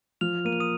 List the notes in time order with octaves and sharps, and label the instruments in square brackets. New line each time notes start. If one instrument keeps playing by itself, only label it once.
[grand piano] F3 [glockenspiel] F6 F7
[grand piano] A#3 [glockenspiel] D#7
[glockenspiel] F7
D#6 D#7